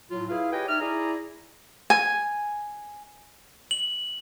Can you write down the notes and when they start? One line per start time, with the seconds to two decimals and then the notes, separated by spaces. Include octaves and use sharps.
0.11 A2 F#3 F4
0.29 E4 F4 G#4 B4 F5
0.52 G4 B4 C#5 D#5 G5 G#5
0.68 D#4 D5 E5 F6
0.80 E4 G#4 D5 G#5 A#5
1.90 G#5
3.71 F#7